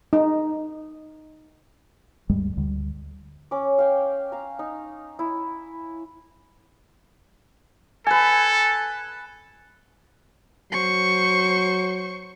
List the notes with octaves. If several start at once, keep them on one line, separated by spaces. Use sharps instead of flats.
D#4
D2 G2 G3 G#3
D2 D3 G3
C#4 D6
F5 G5
F5 A#5
D#4
E4
A4 B4 G#5
F#3 C5 C#6